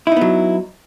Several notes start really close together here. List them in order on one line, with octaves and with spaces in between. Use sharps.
E4 D#4 B3 F#3